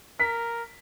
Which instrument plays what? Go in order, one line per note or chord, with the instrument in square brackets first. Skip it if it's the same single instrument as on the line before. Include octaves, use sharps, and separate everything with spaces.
[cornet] A#4 [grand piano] B6